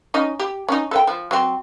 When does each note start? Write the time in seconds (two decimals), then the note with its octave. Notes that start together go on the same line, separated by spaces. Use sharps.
0.14 C#4 D#4 D#5
0.39 G4
0.68 C#4 D#4
0.91 A4 B4 G5
1.07 F3
1.31 F#3 C4